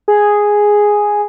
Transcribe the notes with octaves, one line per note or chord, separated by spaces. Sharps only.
G#4